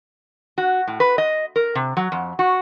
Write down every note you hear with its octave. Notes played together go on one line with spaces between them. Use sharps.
F#4
A2
B4
D#5
A#4
C3
F#3
F2
F#4